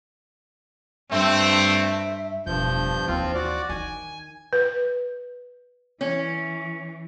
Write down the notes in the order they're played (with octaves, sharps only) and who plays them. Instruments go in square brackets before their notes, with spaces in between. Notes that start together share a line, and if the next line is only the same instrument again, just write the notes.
[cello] G2 [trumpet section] A3 C4 [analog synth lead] E5
[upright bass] E1 [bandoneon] G2 F3 G6
[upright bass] D#2 E3 [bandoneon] F3 C4 F4
[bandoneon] F#4 D5
[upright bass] D#3 [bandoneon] G#5
[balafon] B4
[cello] E3 [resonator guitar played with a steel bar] C#4